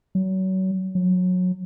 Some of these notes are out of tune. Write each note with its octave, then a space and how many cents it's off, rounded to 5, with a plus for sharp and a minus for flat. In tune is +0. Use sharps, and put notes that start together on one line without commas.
F#3 +30
F#3 -25